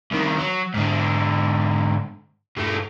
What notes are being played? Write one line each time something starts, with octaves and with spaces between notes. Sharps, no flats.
C2 D#3
F#3
G#2 D3
G2 A3